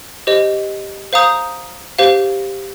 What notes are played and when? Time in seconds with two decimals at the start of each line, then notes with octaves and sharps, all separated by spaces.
0.27 G4 C5 D#5
1.13 C5 F5 A#5 D#6 G6
1.99 G4 C5 F5